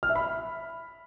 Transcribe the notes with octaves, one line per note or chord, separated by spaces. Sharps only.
F6
E5
B5